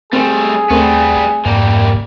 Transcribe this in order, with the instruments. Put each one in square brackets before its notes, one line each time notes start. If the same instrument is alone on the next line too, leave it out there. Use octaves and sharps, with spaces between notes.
[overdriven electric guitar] G3 A3 [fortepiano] C4 [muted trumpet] G#4
[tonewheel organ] D#2 [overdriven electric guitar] G3 B3 [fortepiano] A3 C4
[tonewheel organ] F2 G#2 [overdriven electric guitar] G3 A#3